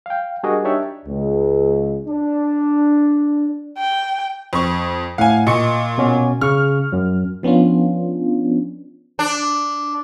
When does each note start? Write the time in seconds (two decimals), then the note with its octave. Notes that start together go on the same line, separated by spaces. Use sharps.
0.06 F5 G5
0.43 G3 D4 F#4 G#4 A#4 D#5
0.65 D4 D#4 G4 C#5 D5 E5
1.06 C#2
2.07 D4
3.78 G5
4.53 F2 C#6
5.18 A2 F5 F#5 G#5
5.47 A#2 D#5 C#6 C#7
5.98 B2 C#4 F#4
6.41 C#3 C#6 F6
6.92 F#2 F#3
7.43 F3 B3 C#4 D4 F4
9.19 D4